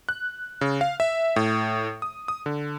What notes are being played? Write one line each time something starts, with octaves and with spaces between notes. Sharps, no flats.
F#6
C#3
F5
E5
A2
D#6
D#6
D3